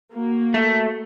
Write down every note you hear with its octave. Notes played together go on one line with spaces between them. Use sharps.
A#3 F#4
A3